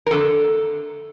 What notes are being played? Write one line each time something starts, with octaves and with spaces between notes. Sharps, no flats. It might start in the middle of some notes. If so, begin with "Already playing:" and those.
A#4
F2 D3 A3 A4